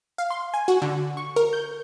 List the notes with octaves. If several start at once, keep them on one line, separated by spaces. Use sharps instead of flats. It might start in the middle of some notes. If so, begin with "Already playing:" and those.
F5
C6
G#5
F#4
D3
C#6
A#4
G6